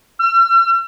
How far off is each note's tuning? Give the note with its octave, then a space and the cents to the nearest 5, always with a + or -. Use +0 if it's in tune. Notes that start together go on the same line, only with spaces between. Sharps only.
E6 +45